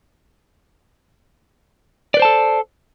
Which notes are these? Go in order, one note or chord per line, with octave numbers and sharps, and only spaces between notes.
A4 B4 C5 D5 A5